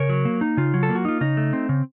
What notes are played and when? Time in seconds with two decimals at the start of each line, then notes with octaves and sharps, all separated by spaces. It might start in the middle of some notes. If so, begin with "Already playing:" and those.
Already playing: C#3 A#4 C#5
0.09 F#3
0.25 A#3
0.41 D#4
0.57 C#3 F4
0.74 F#3
0.83 A4
0.89 A#3
0.95 F#4
1.05 D#4 F4
1.21 C#3 D#4
1.37 A3
1.53 C4
1.69 C#3